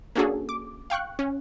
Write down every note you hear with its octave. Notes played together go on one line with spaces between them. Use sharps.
A#3 C#4 D4 F#4 G#4 A4
D6
F5 G5 C#6 F#6
C#4